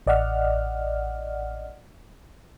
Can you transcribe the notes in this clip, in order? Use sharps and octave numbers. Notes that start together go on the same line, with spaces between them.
A1 D5 D#5 F#5 F6